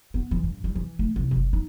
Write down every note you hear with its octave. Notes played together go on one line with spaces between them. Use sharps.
B3
E3
G2
G3
E3
A3
C2
F#1
D#4